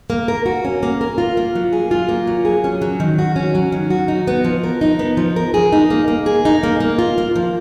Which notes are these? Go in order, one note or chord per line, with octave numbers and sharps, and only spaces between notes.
A#3
A#4
F#4
C#4
A#3
A#4
F4
A#3
F#3
G#4
F4
A#3
F#3
G#4
C#4
F#3
D#3
F#4
C#4
F#3
D#3
F#4
D#4
B3
F3
A#4
D#4
B3
F3
A#4
G#4
D#4
A#3
A#3
G#4
D#4
A#3
A#3
F4
A#3
F3